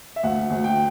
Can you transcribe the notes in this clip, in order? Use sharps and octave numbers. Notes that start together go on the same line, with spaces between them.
E5
D2 F#5
D2
G5